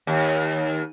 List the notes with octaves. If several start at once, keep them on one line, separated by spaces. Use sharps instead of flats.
D#2